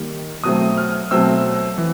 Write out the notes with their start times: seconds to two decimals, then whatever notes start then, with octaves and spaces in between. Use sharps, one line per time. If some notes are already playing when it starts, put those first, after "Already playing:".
Already playing: D#3 G3 A#3
0.44 B2 F#3 A3 C4 D#6
0.77 F6
1.11 B2 F#3 A3 C4 E6
1.78 E3